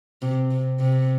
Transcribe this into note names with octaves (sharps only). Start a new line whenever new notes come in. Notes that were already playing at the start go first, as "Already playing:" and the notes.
C3
C3
C3